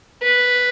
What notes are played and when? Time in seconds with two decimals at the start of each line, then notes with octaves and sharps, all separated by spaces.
0.22 B4